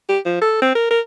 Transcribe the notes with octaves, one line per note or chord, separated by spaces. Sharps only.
G4
F3
A4
C4
A#4
A#4